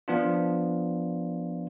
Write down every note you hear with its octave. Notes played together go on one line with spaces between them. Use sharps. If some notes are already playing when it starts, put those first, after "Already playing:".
F3 B3 D4 F4